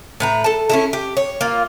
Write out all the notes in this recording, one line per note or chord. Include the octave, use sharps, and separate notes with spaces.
A2 B4 A#5
A4 A5
C#4 E4 A4
G4
C#5
A#3 F4